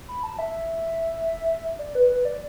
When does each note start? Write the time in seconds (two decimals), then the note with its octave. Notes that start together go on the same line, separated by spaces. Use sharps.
0.08 B5
0.23 A5
0.39 E5
1.79 D5
1.95 B4
2.10 B4
2.25 D5